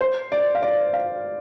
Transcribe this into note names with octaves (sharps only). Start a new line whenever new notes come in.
C5
D5
F5
D5
F5